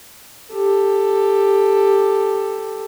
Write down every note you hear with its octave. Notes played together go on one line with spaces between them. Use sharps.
G4 A4